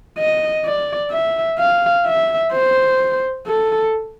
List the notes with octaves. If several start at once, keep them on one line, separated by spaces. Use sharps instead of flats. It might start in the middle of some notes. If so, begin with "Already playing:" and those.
D#5
D5
E5
F5
E5
C5
A4